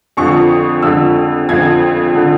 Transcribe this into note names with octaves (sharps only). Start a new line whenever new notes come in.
F2 D3 F3 C#6
F2 D3 F3 E6
F2 D3 F3 G#6
D3 F3